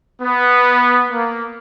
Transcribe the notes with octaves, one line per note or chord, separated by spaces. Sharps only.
B3
A#3